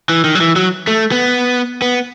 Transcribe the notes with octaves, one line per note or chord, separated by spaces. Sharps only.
E3
D#3
F#3
E3
F#3
A3
B3
B3